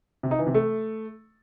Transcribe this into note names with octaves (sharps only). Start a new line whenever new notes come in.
C3
D#4
E3
C3
A3